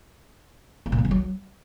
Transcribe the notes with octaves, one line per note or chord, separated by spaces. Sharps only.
A#3
A#2
B3
E3
F#3